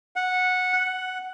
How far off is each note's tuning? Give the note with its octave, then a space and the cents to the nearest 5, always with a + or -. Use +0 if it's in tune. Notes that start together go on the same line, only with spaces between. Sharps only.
F#5 -10
F#5 +5